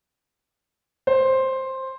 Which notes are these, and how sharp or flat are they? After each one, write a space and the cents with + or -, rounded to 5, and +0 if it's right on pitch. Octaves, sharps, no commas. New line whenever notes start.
C5 +10